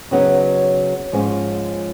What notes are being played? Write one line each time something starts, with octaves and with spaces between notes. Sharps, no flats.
C#3 F#3 B3 D#4
G#2 F3 G#3 C#4